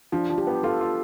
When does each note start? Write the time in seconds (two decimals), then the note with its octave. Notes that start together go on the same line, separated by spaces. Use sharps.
0.12 F3 D4
0.30 F3
0.38 G4
0.47 B3
0.63 F4 A4
0.81 F4